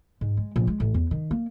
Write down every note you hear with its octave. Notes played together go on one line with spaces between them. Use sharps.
G#2
G#3
A#1
G#3
A1
E2
D#3
A#3